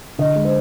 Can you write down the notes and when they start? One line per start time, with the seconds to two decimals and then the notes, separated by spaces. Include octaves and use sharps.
0.18 D3 D#5
0.36 G#3
0.45 C5